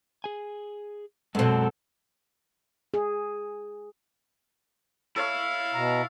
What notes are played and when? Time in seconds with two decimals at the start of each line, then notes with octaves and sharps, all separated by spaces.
0.24 G#4 G#5
1.35 F#2 B2 G#3 C4 A4
2.94 G#4
5.16 E4 A4 C#5 F5
5.74 B2 A#5